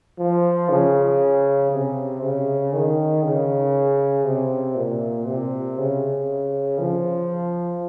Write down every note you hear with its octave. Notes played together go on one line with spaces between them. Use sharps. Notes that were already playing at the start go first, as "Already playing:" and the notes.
F3
C#3
C3
C#3
D#3
C#3
C3
A#2
C3
C#3
F3